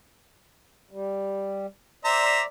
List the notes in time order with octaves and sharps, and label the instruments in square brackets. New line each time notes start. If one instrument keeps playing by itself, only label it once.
[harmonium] G3
[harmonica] C5 E5 A#5 [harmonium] D5